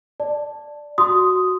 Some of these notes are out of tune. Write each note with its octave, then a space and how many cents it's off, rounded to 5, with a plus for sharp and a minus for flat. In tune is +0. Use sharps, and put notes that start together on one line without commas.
D5 +0 A5 +0
F#4 +0 C6 -10 D#6 +0